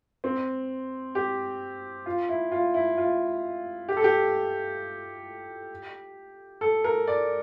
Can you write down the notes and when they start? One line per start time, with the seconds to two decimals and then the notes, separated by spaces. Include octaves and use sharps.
0.24 C4
1.15 G4
2.06 F4
2.29 E4
2.51 F4
2.74 E4
2.97 F4
3.89 G4
3.97 A4
4.04 G4
6.61 A4
6.84 A#4
7.07 D5